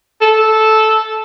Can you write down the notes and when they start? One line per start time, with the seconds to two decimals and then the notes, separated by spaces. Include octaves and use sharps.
0.21 A4